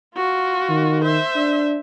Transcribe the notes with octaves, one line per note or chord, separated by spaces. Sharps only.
F4 F#4
D#3
C5 E5
D4